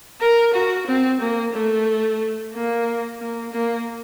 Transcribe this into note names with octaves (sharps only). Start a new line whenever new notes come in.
A#4
F#4
C4
A#3
A3
A#3
A#3
A#3